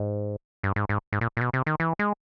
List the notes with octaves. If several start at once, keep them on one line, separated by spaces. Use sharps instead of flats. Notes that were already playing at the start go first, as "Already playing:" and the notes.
Already playing: G#2
G2
G#2
G#2
G#2
A#2
A#2
B2
C3
D#3
E3
G#3